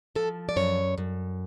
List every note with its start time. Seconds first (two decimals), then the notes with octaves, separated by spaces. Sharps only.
0.15 F3 A4
0.49 D5
0.56 F#2 C#5
0.98 F#2